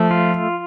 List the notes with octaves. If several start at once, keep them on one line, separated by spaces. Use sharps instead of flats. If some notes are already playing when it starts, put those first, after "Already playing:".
Already playing: F3 A3
F4